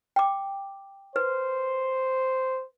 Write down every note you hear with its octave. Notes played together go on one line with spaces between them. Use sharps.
G5 D6
B4 C5